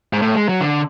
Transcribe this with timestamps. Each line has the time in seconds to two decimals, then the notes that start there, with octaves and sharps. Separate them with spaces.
0.13 G#2
0.22 A2
0.36 G#3
0.49 F#3
0.61 D3